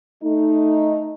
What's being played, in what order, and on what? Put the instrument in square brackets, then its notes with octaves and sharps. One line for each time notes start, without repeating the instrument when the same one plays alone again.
[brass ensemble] A3 D#4